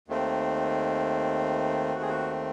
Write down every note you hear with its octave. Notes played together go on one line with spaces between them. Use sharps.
D#2 D#3 A3 C4
F#4
G#4
F#4